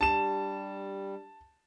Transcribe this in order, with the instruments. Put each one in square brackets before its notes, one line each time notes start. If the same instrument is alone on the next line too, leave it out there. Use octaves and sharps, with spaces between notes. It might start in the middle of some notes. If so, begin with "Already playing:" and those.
[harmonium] G3 [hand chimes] D4 G4 [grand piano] A5 E7